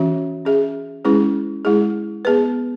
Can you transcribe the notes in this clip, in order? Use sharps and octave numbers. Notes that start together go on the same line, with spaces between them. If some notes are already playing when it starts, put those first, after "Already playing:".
Already playing: E3 C#4 F#4 E5
C#4 G#4 E5
G#3 C#4 E4 G#4 B4
G#3 E4 G#4
B3 G#4 B4